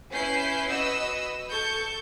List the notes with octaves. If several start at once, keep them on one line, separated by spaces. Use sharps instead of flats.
C#4 E4 B4 G6 C7
F#4 B4 D#5 E6
A4 C#6 G6